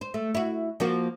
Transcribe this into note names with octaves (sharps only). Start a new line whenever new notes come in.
C5
A3
E4 F#4
F3 A#3 F#4